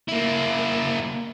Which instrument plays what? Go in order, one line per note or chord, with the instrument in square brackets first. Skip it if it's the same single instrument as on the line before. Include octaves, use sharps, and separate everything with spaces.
[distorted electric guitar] A#3 E4